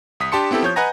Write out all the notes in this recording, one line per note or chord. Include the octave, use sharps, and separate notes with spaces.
C2 D#6 B6
D4 G4 A5 C6 C#7
B3 C4 E4 G4 A4
F3 C#5 G6
B4 D#5 F#5 G#5 A#5 A#6